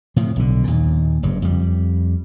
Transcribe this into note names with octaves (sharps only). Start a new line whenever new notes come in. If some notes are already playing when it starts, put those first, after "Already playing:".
A2 C3 F3
B1 D3
D#2 A#2
F#1 G2
F2 G3